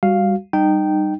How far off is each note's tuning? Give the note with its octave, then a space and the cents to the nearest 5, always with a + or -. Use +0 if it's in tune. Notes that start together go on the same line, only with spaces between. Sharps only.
G3 +10 F#4 +0 F5 +0
G3 +0 D#4 -25 G5 -10